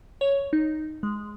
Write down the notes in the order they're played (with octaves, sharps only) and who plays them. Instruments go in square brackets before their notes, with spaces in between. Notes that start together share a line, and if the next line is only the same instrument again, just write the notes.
[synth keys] C#5
D#4
G#3